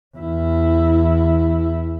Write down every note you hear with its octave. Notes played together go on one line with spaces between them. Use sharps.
E2 E4